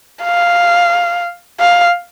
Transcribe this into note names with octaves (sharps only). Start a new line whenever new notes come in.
F5
F5